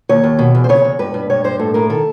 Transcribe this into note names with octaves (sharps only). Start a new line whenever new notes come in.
D#2 C#5
D#2
B2
E2
C5
C#3 C#5
E2
G2 B4
G2
G2 C#5
G2 C5
A2 A4
A2 A#4
D#3 A4